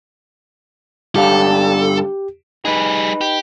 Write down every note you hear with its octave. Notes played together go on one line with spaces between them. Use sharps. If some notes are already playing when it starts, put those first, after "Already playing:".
G2 D3 G4 A4 F5
G3 D#4 G#4 B4
G4